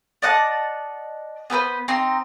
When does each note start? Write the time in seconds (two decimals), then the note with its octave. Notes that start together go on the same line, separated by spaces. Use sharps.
0.22 D5 D#5 F#5 A5
1.50 B3 A4 B4 C5
1.88 C4 D#4 C6